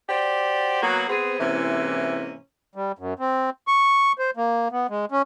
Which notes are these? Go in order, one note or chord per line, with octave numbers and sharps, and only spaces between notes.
F#4 G4 C5 D5
F#3 A#3 B3 F#4
B3 C4 G#4
G#2 C3 E3 A#3 C#4 E4
G3
F#2
C4
C#6
C5
A#3
B3
G#3
C#4